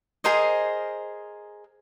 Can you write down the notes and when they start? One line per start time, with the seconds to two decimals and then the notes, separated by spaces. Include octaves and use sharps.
0.24 G#4 A#4 C5 D#5